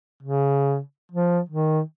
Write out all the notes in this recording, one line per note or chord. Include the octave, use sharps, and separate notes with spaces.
C#3
F3
D#3